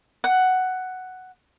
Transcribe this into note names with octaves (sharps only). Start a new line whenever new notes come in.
F#5